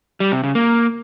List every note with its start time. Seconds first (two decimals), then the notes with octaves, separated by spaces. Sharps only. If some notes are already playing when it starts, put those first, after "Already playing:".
0.20 G3
0.32 C3
0.44 C#3
0.55 A#3